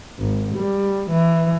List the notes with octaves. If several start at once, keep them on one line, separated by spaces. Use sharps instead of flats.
G#1
G3
E3